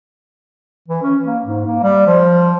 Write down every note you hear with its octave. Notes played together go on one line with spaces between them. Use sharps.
E3
C#4
A#3
G#2
A#3
G3
F3